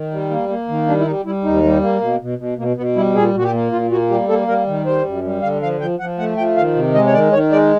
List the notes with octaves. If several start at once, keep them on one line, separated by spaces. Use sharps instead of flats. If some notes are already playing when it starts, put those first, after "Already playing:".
Already playing: D#3
G3
A#3
A#3
D#3
G3 D4
E4
G3 D#4
G3 E4
D#2 D#4
G3
A#3
B2
B2
B2
B2 A#3
B2 B3
G3 E4
A#2 G#4
A#2 F#4
G4
A#3
A#2 F4
A#3 F#4
G3 G4
A#3 A4
G3 A#4
D#3
G3 C5
F#2
G3
D3 F5
F3 F5
F3 G5
F3 F#5
A3 F#5
F3 G5
D#3 F5
C3
G#3 D#5
C#5
D#3 D5
D#3 C#5
G#3 D5